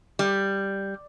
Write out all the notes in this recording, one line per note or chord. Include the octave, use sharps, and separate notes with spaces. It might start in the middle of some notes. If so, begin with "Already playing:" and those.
G3